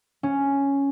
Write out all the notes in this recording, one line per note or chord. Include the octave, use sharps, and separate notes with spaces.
C#4